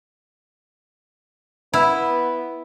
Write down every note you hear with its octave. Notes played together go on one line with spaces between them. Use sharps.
B3 E4